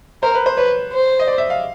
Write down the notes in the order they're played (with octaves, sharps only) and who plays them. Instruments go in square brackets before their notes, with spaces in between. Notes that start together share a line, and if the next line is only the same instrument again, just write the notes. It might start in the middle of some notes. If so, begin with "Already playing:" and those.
[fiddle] A#4 [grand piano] C5
[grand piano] B4
C5
[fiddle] B4 [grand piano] C#5
[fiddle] C5
[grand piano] D#5
D5
E5
F5